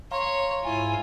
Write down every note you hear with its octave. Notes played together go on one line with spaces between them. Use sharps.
C#5 F5 A#5 C6
G#2 E4 F4 G#5